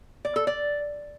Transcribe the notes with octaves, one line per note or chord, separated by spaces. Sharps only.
D5
A4
D5